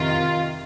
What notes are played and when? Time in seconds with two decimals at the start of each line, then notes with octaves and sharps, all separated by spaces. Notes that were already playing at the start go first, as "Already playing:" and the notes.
Already playing: F2 C3 D#3 F4